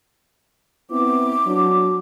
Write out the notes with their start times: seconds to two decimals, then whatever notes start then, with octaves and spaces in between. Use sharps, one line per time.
0.91 B3 C4 E4 D6
1.46 F#3 D4